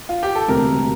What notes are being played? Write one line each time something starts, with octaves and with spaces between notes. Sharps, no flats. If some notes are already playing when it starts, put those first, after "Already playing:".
F4
G4
A4
E1 D2 C3 A#4